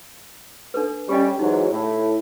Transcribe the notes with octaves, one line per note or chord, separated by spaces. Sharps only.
D4 A4 B4
G3 C#4 G4 D#5
G#2 E3 F#3 D#4
A2